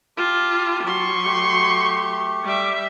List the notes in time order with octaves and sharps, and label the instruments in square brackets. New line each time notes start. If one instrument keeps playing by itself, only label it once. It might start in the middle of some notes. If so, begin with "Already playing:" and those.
[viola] F4 [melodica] G4 A5
[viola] F#3 C6 [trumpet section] C#6
[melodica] A3 G4
[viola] G3 E5 [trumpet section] D6